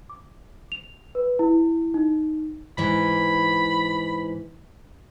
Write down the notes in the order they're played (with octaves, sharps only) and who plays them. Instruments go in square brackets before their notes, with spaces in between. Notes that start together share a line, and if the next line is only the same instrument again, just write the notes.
[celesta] D6
F7
B4
E4
D#4
[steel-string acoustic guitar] G#2 E3 [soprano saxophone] B5